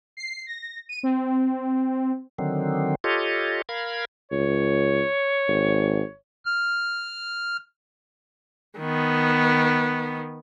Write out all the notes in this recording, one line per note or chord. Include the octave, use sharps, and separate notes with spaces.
C7
A#6
D#7
C4
D3 D#3 F#3 C4
F4 G4 A4 C#5 D#5
A#4 F5 B5 G#6
C#2 C#5
G#1
F6
D#3 B3